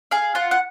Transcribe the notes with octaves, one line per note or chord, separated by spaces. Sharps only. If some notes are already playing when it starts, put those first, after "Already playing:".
G#4 F5
F4 F#5
F#5